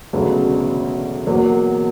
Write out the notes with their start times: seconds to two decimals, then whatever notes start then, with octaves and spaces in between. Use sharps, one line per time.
0.13 E1 D2 C#3 F#3 B3
1.27 E2 B2 F#3 A#3